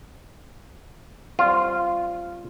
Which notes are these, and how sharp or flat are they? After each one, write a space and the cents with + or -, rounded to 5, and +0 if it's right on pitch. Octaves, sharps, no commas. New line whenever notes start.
G3 +0 C4 +10 F4 -10